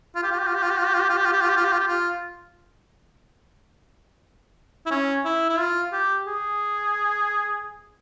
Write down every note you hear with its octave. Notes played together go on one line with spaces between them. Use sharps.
F4
G4
F4
G4
F4
G4
F4
G4
F4
G4
F4
G4
F4
G4
F4
G4
F4
G4
F4
G4
F4
G4
F4
E4
C#4
E4
E4
F4
G4
G#4